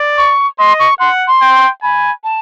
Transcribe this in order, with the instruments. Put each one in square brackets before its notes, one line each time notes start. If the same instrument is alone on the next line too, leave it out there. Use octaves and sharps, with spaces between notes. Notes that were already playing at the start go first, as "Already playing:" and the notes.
Already playing: [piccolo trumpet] D5
[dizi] C#6
[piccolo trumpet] D#5 [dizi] C6
[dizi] C#6
[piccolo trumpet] F#5 [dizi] C6
[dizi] C6
[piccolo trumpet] G5
[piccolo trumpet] G#5 [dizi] B5
[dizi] A5